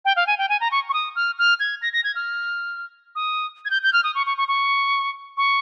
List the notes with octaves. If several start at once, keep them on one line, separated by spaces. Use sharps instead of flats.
G5
F5
G#5
G5
G#5
A#5
C#6
C#6
D#6
F6
F6
G#6
A#6
A#6
G#6
F6
D#6
G#6
G6
G6
F6
D#6
C#6
C#6
C#6
C#6
C#6